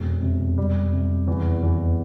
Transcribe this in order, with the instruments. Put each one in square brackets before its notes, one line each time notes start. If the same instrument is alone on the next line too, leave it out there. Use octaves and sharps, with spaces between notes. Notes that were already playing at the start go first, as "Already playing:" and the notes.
Already playing: [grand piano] E1 [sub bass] F2
[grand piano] C3
G3
C3
E2
E2